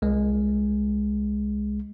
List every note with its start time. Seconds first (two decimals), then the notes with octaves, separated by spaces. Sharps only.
0.02 C2 G#3